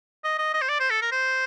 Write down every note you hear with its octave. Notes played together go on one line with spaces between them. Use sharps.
D#5
D#5
D#5
C5
D5
C5
A4
A#4
C5